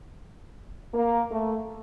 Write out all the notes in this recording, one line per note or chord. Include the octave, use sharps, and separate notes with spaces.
A#3
A3